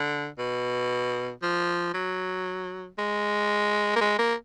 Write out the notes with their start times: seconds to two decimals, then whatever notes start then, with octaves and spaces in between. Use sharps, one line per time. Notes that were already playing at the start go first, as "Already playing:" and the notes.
Already playing: D3
0.39 B2
1.42 F3
1.94 F#3
2.98 G#3
3.96 A#3
4.01 G#3
4.19 A#3